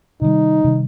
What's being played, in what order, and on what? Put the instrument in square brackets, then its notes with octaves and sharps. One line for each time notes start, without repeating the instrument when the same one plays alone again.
[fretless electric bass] C3 D#3 G3 [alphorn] D#4
[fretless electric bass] C3 D#3 G3